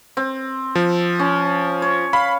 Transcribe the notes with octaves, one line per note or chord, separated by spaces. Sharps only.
C4
F3
C#4
C#5
F5 B5